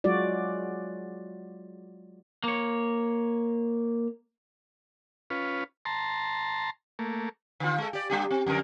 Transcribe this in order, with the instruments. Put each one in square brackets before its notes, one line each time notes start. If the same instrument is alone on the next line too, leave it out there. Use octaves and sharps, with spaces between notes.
[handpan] F#3 G#3 F4 F#4 D5
[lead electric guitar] A#3 C#5
[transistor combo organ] C#4 F4 B4
A5 A#5 C6
A3 A#3
[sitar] D3 F4
G#3 A4
G4 D5
G3 D4 G4
C4
F2 D3 A#4